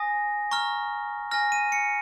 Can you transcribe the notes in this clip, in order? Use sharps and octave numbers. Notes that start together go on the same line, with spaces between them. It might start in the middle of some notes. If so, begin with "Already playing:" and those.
Already playing: G#5 D#6 A#6
A#5 C#6 F6
G#5 F6 A#6
D#7
C#7